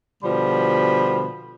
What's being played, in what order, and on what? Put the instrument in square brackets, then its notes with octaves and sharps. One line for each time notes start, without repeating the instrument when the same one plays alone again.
[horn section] B2 D3 F3 G3 B5